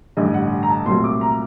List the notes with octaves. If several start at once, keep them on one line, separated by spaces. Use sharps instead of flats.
A1 G2 D3 D#5
F#5
A#5
A5
C2 A#2 F#3 A3 C4 C6
D6
A#5